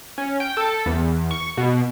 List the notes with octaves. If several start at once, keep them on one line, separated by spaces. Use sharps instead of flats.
C#4
G5
A4
E2
C#6
B2